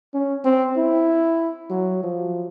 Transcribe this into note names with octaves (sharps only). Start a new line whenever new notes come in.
C#4
C4
E4
F#3
F3